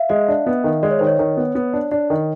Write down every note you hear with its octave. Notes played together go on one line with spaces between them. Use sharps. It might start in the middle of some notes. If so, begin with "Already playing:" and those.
Already playing: E5 F5
G#3 D#5
D4
B3
D#3
G#3 D5
C#5
D#3 C5
C#5
D#3
B3
B3
D4
D4
D#3